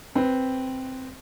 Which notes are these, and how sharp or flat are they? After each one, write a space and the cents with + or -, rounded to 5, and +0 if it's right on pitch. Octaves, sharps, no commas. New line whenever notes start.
C4 +0 B4 +0